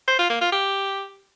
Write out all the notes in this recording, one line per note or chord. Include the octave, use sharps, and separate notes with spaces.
C5
F4
A#3
F4
G4